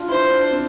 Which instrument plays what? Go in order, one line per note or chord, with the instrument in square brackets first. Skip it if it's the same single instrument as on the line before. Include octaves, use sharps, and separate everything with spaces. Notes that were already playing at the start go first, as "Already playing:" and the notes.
Already playing: [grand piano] D4 F4
[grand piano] E4 [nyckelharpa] C5
[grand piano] D4
C4